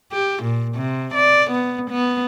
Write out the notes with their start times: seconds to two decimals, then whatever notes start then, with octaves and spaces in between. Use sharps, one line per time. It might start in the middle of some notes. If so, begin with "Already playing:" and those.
0.12 G4
0.44 A#2
0.76 C3
1.15 D5
1.51 B3
1.91 B3